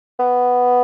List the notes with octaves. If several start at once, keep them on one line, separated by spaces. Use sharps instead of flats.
B3